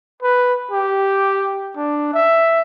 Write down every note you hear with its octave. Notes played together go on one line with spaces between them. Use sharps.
B4
G4
D4
E5